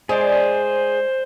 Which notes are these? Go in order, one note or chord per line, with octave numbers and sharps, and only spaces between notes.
G#3 G#4 C5 D5